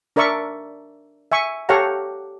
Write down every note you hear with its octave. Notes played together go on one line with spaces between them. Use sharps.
D4 A#4 D5 E5 C#6
E5 G#5 C#6
G4 A4 C#5 F5 F#5 A#5